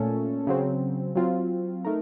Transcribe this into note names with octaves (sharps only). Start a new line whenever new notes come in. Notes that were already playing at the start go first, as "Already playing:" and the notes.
Already playing: A#2 A3 C#4 A4
C#3 F#3 C4
F#3 C4 F4
A3 D#4 A#4